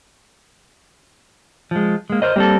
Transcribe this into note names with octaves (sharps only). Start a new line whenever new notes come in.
F3 G#3
G#3 A#3
A#4 C5 D#5
G3 A#3 C4 A4